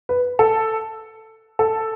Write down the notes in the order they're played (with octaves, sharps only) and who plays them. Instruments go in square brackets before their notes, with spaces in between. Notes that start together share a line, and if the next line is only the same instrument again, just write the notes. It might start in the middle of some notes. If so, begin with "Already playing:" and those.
[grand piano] B4
A4
A4